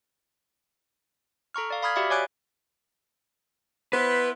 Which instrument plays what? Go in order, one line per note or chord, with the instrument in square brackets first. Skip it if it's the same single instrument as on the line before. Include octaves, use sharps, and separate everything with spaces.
[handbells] A4 A#5 C#6 F6
D5 F5
F5 B5 D#6 F6 G#6 B6
F#4 G4 D5 E5 F5 B5
C#5 D5 G#5 D6 F#6 D7
[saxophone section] B3 E4 C5 [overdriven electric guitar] B4